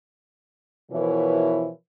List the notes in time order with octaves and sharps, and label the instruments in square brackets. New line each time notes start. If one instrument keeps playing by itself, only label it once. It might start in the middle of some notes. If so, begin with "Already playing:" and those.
[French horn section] B2 E3 F3 E4 A#4 C#5